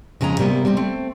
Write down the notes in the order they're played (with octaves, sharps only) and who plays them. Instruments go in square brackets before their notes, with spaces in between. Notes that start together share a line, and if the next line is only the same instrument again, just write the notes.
[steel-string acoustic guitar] F2 C#3 G#3 A5 A#5
C3 G3 A#3 B3
G3 C4
A3 C4